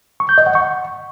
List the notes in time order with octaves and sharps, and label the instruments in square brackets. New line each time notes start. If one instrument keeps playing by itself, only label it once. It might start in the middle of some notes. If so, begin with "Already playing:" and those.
[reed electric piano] C#6
G6
D#5
F#5
C#6